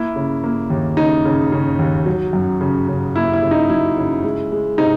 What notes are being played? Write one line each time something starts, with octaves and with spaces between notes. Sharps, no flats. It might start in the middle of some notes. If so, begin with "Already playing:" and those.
Already playing: A#3 E4
C#3
A#3
D#2
C#3 D#4
C#3
C#3
D#2
F#3
F#2
C#3
C#3
A#3 E4
E4
C#3
D#4
F#3 E4
C#3
G#3
G#3
C3 D#4